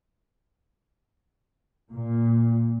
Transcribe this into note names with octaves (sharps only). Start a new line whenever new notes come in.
A#2